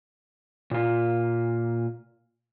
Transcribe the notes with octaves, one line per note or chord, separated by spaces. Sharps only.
A#2 F4